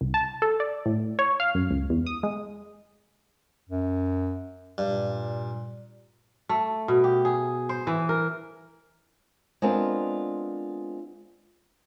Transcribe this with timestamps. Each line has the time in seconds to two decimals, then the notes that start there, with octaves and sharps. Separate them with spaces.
0.01 C2
0.14 A5
0.42 A4
0.60 D5
0.86 A2
1.19 C#5
1.40 F5
1.55 F#2
1.71 C#2
1.90 E2
2.07 D#6
2.23 G#3
3.69 F#2
4.78 G2 A#2
6.49 A3
6.88 B2
7.04 G4
7.25 G#4
7.69 C5
7.87 E3
8.09 A#4
9.62 G#3 B3 C4 D4 F4 A#4